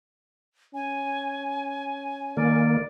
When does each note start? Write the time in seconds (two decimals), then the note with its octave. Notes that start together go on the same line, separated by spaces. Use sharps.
0.74 C#4 G#5
2.37 D#3 A#3 D5